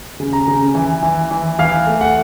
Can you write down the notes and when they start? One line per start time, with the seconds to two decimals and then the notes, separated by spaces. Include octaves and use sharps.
0.20 C#3
0.33 A#5
0.48 C#3
0.75 E3
1.03 E3
1.31 E3
1.59 E3 F5
1.87 A3
2.01 F#5